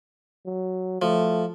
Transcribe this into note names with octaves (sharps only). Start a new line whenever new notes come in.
F#3
F3 A3